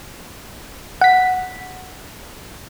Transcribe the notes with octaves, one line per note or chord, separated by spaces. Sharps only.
F#5 B6